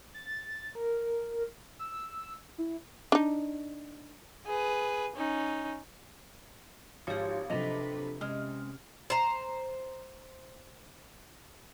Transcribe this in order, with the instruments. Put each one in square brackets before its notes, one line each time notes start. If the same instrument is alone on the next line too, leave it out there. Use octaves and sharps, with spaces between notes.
[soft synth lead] A6
A#4
E6
E4
[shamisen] D4 D#4
[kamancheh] G#4 B4
C#4 D#4
[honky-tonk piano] G#1 A6 [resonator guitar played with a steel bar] F3 G#3 [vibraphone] G4 C#5
[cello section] C3 B4 [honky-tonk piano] F3 F#3 F7 [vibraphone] D4 A4 [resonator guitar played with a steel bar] D#5
[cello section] C3 [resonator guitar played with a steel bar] G#3 [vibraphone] C#4 [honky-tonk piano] F6
[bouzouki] C5 A#5